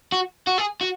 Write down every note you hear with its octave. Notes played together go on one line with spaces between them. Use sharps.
F#4
F#4
G#4
F#4